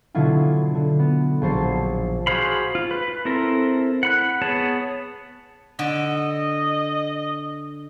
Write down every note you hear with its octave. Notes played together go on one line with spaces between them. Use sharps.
B2 D3 F#3 E4 F4
D3
B3
A#1 F#3 C5 A5 C7
F#4 G#4 C5 F5 B5
F4
B4
C4 E4 A4 A#4 A#5
F#5 B5 F#6
B3 G#4 C#5 A5
D3 D#5